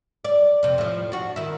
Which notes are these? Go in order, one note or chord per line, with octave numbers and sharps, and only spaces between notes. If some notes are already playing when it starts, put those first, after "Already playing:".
D5
F2 C3
A2 F3
D4 F#4
D#3 E4